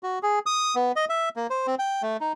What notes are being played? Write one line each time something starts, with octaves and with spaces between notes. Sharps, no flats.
F#4
G#4
D#6
B3
D#5
E5
A#3
C5
C4
G5
A3
D#4